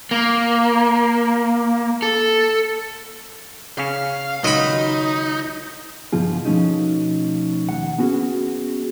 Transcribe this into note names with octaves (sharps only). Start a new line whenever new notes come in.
A#3
A4
C#3 C#4 F5
C#2 D#3 F#3 D#4 D#5 B5
C#2 G2 B2 F3 F4 G#4
B2 F3 A3 C#4 D#4
D#2 F#5
B3 C#4 F#4 G#4